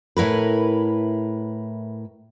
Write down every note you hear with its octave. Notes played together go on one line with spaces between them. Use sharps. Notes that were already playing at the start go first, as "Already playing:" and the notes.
A2 E4 A#4 B4